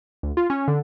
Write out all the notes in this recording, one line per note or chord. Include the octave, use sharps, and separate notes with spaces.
D2
F4
C#4
D3